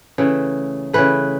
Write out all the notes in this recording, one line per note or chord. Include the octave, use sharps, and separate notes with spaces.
C#3 E3 A3
C#3 E3 A3 B4